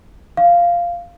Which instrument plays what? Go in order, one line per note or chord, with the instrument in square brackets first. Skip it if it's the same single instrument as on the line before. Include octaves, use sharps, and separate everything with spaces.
[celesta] F5